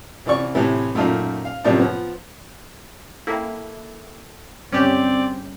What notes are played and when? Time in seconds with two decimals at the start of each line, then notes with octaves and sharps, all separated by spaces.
0.26 C2 E3 D5 C#6
0.55 A2 C3 E3
0.95 F#2 A#2 A3 D#4 F5
1.45 F5
1.64 F#2 A2 C3 F3 A#3 D5
1.79 F3 B3
3.27 A#3 E4 A4 G5
4.72 G1 G2 C#3 C4 C#4 G4 D5